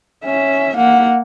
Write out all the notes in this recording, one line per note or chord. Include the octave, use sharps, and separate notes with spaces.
C#4 E5
A#3 F#5